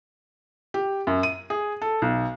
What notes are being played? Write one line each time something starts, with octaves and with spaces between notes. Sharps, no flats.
G4
F#2
D#7
G#4
A4
B1